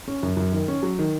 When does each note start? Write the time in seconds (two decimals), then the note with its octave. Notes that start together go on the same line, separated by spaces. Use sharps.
0.08 C#4
0.23 F#2
0.37 F#2
0.52 D#3
0.68 C#4
0.83 F#3
0.99 D#3